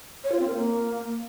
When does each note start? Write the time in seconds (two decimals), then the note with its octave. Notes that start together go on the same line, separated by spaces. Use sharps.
0.24 C#5
0.32 F4
0.40 C4
0.48 A#4
0.55 A#3